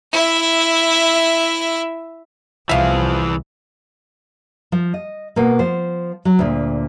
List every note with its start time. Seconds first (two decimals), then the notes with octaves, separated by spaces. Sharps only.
0.12 E4 E5
2.69 C2 E3 F3 G#4 E5 F5
4.72 F3
4.94 D#5
5.36 B2 A#3
5.59 F3 C5
6.25 F#3
6.39 D2 A#2